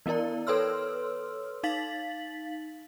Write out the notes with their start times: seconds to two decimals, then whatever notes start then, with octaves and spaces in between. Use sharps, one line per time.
0.06 E3 B3 E4 A#4 D5
0.47 A4 B4 C#5 C6 E6 F6
1.63 D#4 F5 A6 B6 F#7